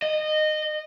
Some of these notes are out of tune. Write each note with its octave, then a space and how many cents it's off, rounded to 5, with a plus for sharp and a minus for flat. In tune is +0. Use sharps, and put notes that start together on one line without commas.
D#5 -20